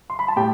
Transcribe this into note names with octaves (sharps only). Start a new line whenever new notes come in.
C6
B5
A5
A2 G4 G5